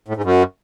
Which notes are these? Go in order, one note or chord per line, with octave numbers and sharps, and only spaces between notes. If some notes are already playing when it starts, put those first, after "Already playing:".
A2
G#2
F#2